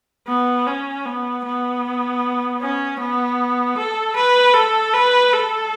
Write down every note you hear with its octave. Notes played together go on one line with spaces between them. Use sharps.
B3
C#4
B3
B3
C#4
B3
A4
B4
A4
B4
A4